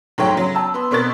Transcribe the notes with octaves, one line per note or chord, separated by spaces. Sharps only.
G#2 F#3 A3 C#5 G5
C#3 F#3
A5 E6
B3 C6
B2 C4 A#4 C#6 F#6 A6